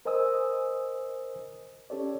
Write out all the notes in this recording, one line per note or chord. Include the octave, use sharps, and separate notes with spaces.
A#4 C5 D#5 G#5 D#6 E6
C#4 G4 A4 C#5 D5